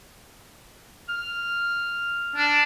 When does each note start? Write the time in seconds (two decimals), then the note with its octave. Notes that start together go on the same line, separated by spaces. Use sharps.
1.09 F6
2.36 D4